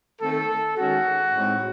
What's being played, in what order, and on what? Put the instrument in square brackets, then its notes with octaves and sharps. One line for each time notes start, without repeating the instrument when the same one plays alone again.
[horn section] D#3 A3 C4 A4
D#3 G#3 C#4 F#4
A2 G#3 C4 D#4